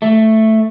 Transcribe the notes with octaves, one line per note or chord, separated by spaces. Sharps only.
A3